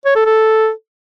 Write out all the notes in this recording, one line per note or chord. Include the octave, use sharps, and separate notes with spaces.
C#5
A4
A4